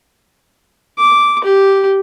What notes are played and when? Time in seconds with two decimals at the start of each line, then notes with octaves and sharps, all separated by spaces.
0.98 D6
1.44 G4